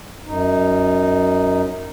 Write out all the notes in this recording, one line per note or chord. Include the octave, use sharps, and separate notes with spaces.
F#2 D#4